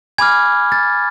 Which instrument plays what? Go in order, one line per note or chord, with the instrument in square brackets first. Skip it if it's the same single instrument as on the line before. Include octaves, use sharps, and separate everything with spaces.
[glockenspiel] G#5 B5 D6 F6 G#6
A6